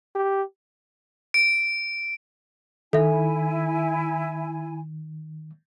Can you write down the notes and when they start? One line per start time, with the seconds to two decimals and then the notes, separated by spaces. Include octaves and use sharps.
0.15 G4
1.34 D7
2.93 D#3 E4 A4 E5 G#5